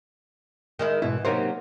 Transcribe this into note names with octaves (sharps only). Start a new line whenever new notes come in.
D#3 G#3 E4
G#2 B2 E3 E4
C3 F#3 A#3 D#4 A#4 C5